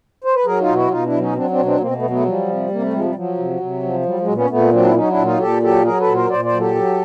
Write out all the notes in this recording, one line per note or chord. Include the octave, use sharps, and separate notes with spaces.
C5
B4
F#3 G#4 A#4
D#4 F4
B2
E4 F#4
B2 D#4 F4
D4 E4
F#3
C#4 D#4
F#3 C4 D4
C4 D4
B2
C4 D4
B2 A#3 C4
A#3
A3 B3
F#3
A3 B3
G#3
F3 G3
C3
C3 A#3
A3
F3 G#3
G3
F3 F#3
C3
C3
F3
F#3 G3
F#3 G#3
A#2
B3 C#4
A#2 A3 B3
F#3 C4 D4
E4
F#3 C#4 D#4
D4 E4
A#2
D#4 F4
A#2 G4 A4
F#3 G4 A4
F#3 G#4 A#4
A4 B4
A#2
A#4 C5
A#2 C5 D5
C5 D5
F#3
G4 A4
F#3